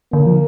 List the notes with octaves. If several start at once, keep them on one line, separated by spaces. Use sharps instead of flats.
D3 A#3
F3